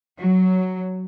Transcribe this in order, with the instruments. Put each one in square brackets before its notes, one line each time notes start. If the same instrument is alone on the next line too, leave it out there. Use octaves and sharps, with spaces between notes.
[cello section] F#3